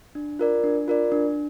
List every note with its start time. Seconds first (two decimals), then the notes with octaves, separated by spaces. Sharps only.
0.15 D4
0.39 F4 A#4 D5
0.64 D4
0.88 F4 A#4 D5
1.12 D4